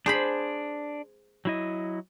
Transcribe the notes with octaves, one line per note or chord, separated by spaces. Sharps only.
D4 G#4 C5 B5
F#3 E4 D#5